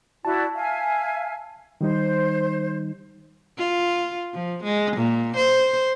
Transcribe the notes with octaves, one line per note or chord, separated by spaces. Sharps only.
E4 F#4 D5 A5
E5 F5 G#5
D#3 G3 D#4 C5
F4
F3
G#3
A#2
C5